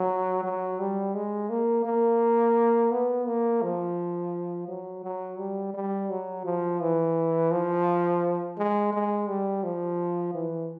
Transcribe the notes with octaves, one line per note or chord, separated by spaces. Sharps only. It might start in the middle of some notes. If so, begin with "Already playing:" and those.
Already playing: F#3
F#3
G3
G#3
A#3
A#3
B3
A#3
F3
F#3
F#3
G3
G3
F#3
F3
E3
F3
G#3
G#3
G3
F3
E3